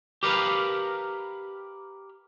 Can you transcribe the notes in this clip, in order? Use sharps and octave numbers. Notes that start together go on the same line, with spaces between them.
G4 A#4 B4 F5